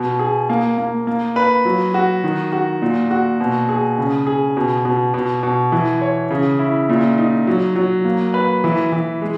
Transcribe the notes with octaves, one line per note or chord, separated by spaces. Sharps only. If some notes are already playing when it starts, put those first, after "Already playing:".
Already playing: B2
G#4
A#3
A#3
A#3
B4
F#3
F#4
D#3
F#4
A#2
F#4
B2
G#4
C#3
G#4
B2
B2
B2
B2
E3
C#5
C#3
E4
A#2
D#4
F#3
F#3
A#3
B4
E3
E3
G#3